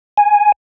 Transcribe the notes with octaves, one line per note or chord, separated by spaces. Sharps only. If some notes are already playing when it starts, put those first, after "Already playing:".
G#5